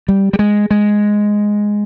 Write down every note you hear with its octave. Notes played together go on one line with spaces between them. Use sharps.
G3
G3
G#3
G#3